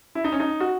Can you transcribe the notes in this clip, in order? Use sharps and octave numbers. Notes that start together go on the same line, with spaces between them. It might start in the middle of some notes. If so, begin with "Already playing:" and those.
E4
D#4
C#4
D#4
F#4